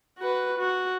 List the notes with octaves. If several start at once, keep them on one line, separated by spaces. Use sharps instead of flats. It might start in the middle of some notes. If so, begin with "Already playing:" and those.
F#4 B4
F#4